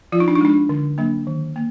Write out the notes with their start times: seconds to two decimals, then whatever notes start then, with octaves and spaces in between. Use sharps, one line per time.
0.12 F3 F4
0.20 D#4
0.28 D4
0.35 D#4
0.41 G#3 D4
0.69 D3
0.98 F#3 A#3 D4
1.27 D#3
1.56 A#3